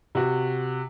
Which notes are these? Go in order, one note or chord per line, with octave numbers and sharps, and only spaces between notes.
C3 F#4